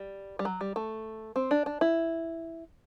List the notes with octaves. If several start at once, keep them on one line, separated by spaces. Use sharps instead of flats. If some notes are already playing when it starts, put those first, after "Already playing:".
Already playing: G3
G3
F#3
G3
A3
C4
D4
D4
E4